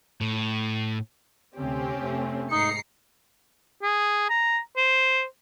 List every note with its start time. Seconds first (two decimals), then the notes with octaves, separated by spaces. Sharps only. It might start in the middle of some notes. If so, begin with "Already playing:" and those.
0.21 A2
1.56 D2 C3 C4 C#4 G4
1.99 F1 A3
2.51 G#2 D#4 A#5 C7 C#7
3.82 G#4
4.29 A#5
4.77 C5